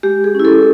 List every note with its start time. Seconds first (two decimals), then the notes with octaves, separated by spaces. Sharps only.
0.03 G#3 G4
0.24 G#4
0.35 C#4 E4
0.45 A4